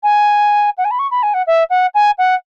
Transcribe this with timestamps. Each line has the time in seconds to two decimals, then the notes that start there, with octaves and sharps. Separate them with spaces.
0.03 G#5
0.78 F#5
0.85 G#5
0.91 B5
0.99 C#6
1.11 B5
1.23 G#5
1.34 F#5
1.47 E5
1.70 F#5
1.94 G#5
2.18 F#5